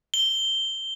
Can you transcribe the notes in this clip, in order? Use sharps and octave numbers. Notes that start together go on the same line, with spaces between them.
G7